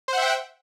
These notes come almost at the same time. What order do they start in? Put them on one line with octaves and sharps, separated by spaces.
C5 F#5 E5 G5